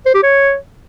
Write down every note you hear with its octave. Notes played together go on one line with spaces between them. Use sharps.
C5
G4
C#5